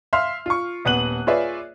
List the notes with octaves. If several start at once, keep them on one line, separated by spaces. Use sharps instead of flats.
E5 F5 C6 F6
F4 C#6
D#1 B3 F#5 F#6 D#7 F#7
F4 G#4 B4 C#5 D5 E5